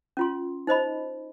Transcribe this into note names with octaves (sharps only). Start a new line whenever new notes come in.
C#4 F4 C6
D#4 C5 D#5 B5